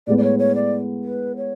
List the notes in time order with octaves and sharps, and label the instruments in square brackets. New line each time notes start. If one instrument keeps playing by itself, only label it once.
[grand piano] A2 G#3 B3 [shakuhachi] D5
[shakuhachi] D5
C#5
C#5
D5
B4
C#5